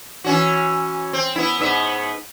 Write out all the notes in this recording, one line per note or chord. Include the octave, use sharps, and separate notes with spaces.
E3 C#4 F#4
C4
B3 E4
G#2 B3 E5